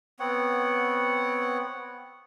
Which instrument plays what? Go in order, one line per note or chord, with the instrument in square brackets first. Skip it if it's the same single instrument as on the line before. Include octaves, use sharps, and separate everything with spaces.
[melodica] B3 C4 C#5 F#5